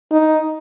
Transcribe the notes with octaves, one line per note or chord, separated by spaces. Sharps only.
D#4